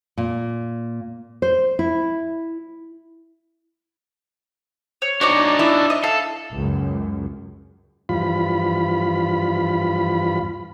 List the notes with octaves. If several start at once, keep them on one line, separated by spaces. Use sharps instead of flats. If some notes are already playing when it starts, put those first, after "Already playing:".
A#2
C5
E4
C#5
D4 D#4 F#4 C#5 D5
E4
D#5
A4 F5
C#2 F#2
E2 G2 F3 F4 B5